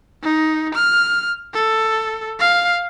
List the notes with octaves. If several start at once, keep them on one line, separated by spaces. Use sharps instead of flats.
D#4
F6
A4
F5